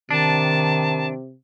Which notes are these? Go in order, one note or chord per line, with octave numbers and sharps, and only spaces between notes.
C3 D#3 D4 A5